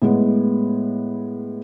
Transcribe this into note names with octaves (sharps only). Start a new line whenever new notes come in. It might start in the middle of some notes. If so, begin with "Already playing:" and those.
A2 G#3 B3